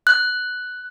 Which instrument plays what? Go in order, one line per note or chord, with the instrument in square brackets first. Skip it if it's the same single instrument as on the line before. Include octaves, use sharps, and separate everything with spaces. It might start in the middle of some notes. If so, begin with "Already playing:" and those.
[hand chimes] F#6